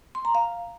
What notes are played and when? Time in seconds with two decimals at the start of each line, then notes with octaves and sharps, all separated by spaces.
0.15 C6
0.25 A#5
0.35 F5